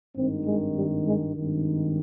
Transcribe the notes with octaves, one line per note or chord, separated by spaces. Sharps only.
G#1 G2 D#3 C4
G#3
G3
G#3
G#1 G2 D#3